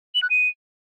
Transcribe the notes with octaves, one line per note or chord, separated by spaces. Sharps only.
F#7
F#6
D#7